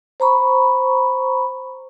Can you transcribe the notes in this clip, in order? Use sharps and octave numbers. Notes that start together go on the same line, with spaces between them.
C5 A#5 B5 C#6